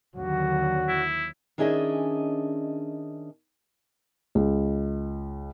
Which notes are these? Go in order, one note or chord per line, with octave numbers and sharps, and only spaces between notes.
D#2 D3 F#3 F#4
E4
D#3 C#4 D4 G#4 D#5 E5
C#2